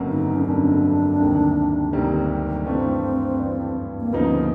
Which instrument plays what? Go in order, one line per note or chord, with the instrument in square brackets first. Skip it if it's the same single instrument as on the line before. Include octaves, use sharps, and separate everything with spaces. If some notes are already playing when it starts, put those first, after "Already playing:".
Already playing: [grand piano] G1 F2 C#3 F#3 A#3
[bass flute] D#4
C#4
[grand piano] G1 F2 C#3 F#3 A#3 [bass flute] D4
[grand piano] D2 C3 D#3 G3 A#3
D2 C3 D#3 G3 A#3
[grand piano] G2 E3 A3 D4 [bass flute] C4
[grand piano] G2 E3 A3 D4
[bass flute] A#3
[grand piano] D2 C#3 F3 A#3 D#4 [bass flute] B3